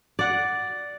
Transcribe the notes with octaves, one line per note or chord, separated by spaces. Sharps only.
D5 F#5